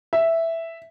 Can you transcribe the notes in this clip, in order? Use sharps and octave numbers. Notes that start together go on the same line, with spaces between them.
E5